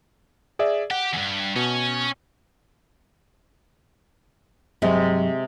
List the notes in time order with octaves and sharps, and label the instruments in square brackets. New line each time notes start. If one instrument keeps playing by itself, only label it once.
[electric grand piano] G#4 D5 E5
[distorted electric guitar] G4 [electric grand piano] F#5
[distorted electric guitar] E2 G2
[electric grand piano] B2 [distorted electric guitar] C#4
[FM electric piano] G2 F#3 [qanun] C3 G#3